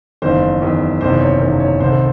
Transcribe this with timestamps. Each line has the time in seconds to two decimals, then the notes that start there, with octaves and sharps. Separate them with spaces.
0.22 F#1 E2 D#3 C5
0.61 F#1 E2 D#3
1.01 F#1 E2 C3 D#3 C5
1.20 C#5
1.41 F#1 E2 C3 D#3
1.60 C#5
1.80 C2 C3 D#3 C5
1.90 A4